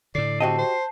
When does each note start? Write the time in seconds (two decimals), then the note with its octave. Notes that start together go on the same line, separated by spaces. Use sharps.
0.15 A2 D3 D5 C7
0.40 C4 F#4 G4 D#5 A5
0.58 C5